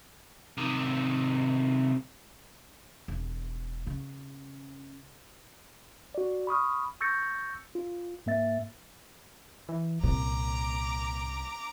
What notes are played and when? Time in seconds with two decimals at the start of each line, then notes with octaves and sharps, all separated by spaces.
0.58 C3 D#3
3.08 E1
3.87 C#3
6.15 F#4 D5
6.47 B5 C#6 D#6 F6
7.01 C#6 E6 G6 A6 A#6 C#7
7.75 F4
8.26 G#2 A#3 E5 A6
9.69 E3
10.03 C2 A#2 A#5 D6